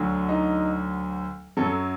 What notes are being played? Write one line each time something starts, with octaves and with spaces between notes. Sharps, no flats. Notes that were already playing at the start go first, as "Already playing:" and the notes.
Already playing: D2 D3 F#3
D#4
F#2 F#3 A4